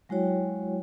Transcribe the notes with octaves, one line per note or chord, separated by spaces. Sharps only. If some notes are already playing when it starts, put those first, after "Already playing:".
F#3 G#3 E4 F#4 C#5 G5